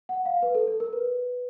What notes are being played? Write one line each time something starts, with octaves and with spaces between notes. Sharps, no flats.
F#5
F5
B4
A4
A4
A#4
B4